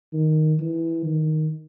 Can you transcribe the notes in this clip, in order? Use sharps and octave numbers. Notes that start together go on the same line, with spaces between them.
D#3
E3
D#3